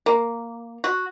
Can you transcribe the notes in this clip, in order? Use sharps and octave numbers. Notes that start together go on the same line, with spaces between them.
A#3
F#4